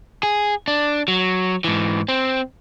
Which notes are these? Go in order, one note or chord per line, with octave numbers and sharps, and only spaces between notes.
G#4
D4
F#3
G#2 E3
C4